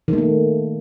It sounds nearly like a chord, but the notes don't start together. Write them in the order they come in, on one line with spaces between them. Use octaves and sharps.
D#3 A3 A#3